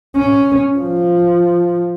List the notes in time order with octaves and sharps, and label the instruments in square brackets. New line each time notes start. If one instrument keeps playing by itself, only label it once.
[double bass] C#4
F3